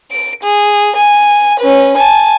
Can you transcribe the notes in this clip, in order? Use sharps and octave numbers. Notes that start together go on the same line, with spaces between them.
D7
G#4
G#5
C#4 B4
G#5 A5